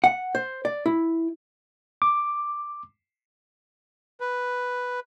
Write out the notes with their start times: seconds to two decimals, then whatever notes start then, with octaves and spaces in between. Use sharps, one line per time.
0.04 F#5
0.35 C5
0.65 D5
0.86 E4
2.02 D6
4.20 B4